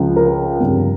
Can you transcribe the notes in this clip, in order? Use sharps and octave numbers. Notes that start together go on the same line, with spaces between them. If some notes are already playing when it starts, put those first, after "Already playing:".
Already playing: C#2 C#3 F3
A#4
G1 F2 C#3 G3